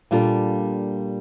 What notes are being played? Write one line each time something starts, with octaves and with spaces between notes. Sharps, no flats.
A#2 G3 D4 F4 A4